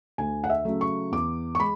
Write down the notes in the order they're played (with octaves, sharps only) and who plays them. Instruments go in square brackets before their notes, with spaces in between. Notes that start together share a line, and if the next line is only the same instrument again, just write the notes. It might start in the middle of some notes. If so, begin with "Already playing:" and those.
[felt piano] D2 G#5
F#5
E5
C#3 F#3 A3
C#6
E2 D6
C#6
G#3 B5